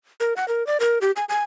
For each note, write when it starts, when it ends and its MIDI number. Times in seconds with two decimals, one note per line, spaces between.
0.20 0.34 70
0.37 0.47 78
0.48 0.66 70
0.67 0.78 74
0.80 0.99 70
1.01 1.11 67
1.16 1.25 80
1.29 1.43 80